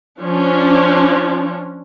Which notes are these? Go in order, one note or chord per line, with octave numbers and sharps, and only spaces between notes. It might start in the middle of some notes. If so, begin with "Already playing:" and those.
F3 C#4 D4